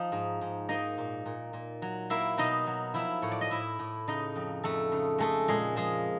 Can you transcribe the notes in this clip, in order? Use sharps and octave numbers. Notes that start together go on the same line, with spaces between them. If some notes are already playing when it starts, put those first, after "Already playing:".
Already playing: F3 D#4
G#2
G#2
A#3 D#4 D#5
A#2
A#2
A#2
F#3
A#3 E4 E5
B2 D#4 D#5
F#3
F3 E4 E5
A2 C#5
D5
D#5
A2 E4 E5
A2
C#3 D#4 D#5
F2
F2 A3 A4
C#3
G#3 A3 A4
A#2 G#3 G#4
F3 G#3 G#4